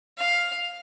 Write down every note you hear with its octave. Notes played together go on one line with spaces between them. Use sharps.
F5